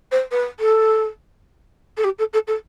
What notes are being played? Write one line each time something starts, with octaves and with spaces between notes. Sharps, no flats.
C5
B4
A4
A4
G4
A4
A4
A4